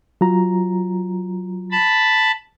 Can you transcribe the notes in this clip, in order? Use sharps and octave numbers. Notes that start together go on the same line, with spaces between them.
F#3 F4 A#5
A5 B5